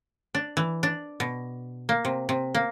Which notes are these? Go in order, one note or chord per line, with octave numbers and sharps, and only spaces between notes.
D4
E3
D4
B2
A#3
C3
C3
A#3